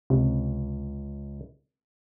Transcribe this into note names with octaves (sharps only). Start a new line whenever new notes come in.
C#2 C3